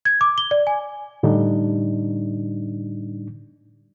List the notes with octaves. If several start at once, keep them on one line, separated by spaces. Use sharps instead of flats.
G#6
D6
G7
D5
G#5
A2 D3 G3 D4 D#4